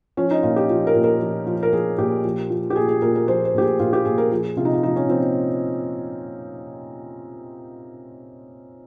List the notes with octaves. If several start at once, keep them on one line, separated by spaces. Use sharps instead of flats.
F3 C#4
D#4
A#2 F4
G4
F3
A#4
A#2
A#4
F3
F3
A#4
F3 G#4
A#2 G4
F3
F3
G4
A#2 G#4
G#4
A#2 A#4
A#4
F3 C5
C5
A#2 G4
G#4
A#2 F4
G4
A#2 G#4
A#4
F3 G#4
C3 F4
D#4
F4
F3 D#4
C#4
F3 C4